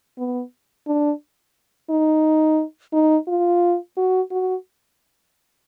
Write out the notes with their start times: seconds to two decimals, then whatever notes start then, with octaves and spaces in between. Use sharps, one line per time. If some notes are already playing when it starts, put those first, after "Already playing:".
0.18 B3
0.87 D4
1.90 D#4
2.93 D#4
3.28 F4
3.97 F#4
4.31 F#4